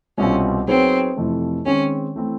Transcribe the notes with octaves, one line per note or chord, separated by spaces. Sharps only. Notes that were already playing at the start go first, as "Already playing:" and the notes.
C2 B2 G3 C4 C#4 F4
F#3 B3 C4 D#4 G#4 C#5
F2 C3 E3 A3
D#3 G#3 C4 C#4
E3 A3 C4 E4